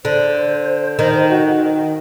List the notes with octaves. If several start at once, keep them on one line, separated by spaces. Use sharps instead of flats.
D3 C5
D#3 C5
C5
F#4